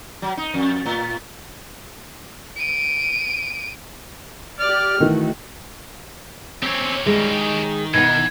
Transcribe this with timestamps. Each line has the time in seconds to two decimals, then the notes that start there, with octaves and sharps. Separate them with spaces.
0.22 F#3
0.37 D#4
0.54 F2
0.85 A2
2.56 D7 D#7
4.60 G4 D5 F6
5.00 D#3 E3 A3 F#4
6.63 C4 C#4 G4 C#5
7.06 D#3 G3 G#3 G#4
7.31 D#3
7.94 B2 E3 D#4 F#5 G#6